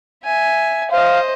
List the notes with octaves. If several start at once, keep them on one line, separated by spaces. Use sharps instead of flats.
E5 G#5
C5 D#5 F5